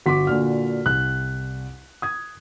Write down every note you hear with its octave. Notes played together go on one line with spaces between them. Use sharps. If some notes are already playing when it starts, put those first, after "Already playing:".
G1 F#4 C6 D6 B6
A#2 D3 F6
C2 F#6
D#6 G#6